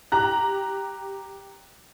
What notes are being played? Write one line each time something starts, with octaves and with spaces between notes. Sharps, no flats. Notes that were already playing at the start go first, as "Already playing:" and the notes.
G4 A#5 F#6